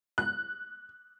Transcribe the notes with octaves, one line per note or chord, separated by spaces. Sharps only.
F#6